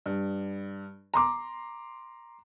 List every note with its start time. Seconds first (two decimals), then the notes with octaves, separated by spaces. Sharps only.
0.06 G2
1.14 A#5 C6 D6